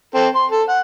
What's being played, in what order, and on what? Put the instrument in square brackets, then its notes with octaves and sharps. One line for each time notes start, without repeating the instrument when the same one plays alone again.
[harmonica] C4 A4
C6
A4
F#5